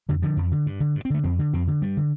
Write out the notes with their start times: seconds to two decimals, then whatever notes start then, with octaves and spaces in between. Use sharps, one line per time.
0.09 F2 D3
0.22 D3 F3
0.37 F2
0.52 D3
0.66 G2
0.80 D3
0.95 G2
1.05 C4
1.10 D3 A3
1.23 F2 C4
1.39 D3
1.53 F2 C4
1.67 D3
1.82 G2 G3
1.97 D3